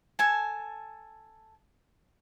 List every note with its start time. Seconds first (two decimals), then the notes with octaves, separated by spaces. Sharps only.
0.19 A4 G#5 A5